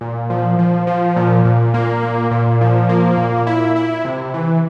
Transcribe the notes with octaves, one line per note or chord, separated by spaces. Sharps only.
A#2
F3
F3
F3
A#2
A#2
A#3
A#2
A#2
F3
A#3
A#2
E4
E4
C3
E3